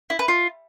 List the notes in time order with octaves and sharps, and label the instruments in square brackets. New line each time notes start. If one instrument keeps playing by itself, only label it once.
[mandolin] E4
B4
F4